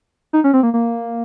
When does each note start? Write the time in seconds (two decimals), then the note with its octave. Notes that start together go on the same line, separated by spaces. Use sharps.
0.33 D#4
0.44 C#4
0.54 C4
0.63 A#3
0.74 A#3